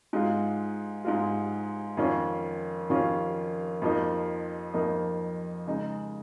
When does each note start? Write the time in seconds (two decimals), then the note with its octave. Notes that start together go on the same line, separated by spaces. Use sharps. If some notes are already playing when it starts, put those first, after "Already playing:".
0.13 G#2 G#3 F4
1.05 G#2 G#3 F4
1.97 F2 D#3 C#4 F4
2.90 F2 D#3 C#4 F4
3.82 F2 F3 A#3 D#4
4.74 F2 F3 A#3 D#4
5.67 C#3 G#3 D#4